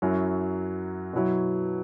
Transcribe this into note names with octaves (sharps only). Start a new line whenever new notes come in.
F#2 F#3 E4
B2 F#3 E4